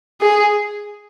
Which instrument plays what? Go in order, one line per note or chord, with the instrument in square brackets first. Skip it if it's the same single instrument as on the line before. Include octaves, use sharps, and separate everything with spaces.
[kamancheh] G#4